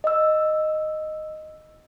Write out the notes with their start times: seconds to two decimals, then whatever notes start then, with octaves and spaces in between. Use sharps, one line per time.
0.04 D#5 E6